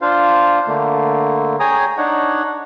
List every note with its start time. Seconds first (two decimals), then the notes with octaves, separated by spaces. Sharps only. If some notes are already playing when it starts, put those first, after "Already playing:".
0.02 D4 F4 C5 F5
0.68 D3 A3 A#3
1.60 G#4 C#5 G5 G#5 A#5 D#6
1.97 D4 D#4 C#5 F#5